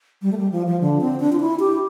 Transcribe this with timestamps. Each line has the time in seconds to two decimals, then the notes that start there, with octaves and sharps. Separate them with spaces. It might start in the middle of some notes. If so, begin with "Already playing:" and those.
0.22 G3
0.32 A3
0.37 G3
0.52 F3
0.67 F3
0.81 D3
1.01 C4
1.20 D4
1.32 F4
1.40 E4
1.60 G4